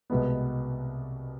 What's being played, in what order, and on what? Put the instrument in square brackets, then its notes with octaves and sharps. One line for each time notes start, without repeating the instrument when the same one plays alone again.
[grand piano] C2 B2 G#3 B3